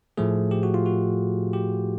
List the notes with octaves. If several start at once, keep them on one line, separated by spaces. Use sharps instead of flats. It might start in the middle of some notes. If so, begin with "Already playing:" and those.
A2 F3 A3 G#4
G4
F#4
F4
F#4
G4